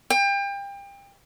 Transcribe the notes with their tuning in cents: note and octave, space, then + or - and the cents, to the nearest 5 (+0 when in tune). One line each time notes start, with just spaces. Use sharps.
G5 +30